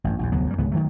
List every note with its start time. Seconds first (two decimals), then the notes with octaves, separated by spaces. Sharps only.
0.04 A1 G2
0.19 A#1 D#2
0.32 F1 D2 F#3 B3
0.47 F#2 G3
0.58 D1 C#2 G#2 B3
0.72 D#3 E3 F#3 A3